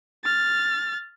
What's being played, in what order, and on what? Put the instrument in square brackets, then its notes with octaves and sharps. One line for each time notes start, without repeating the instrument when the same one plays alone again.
[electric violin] F6 A6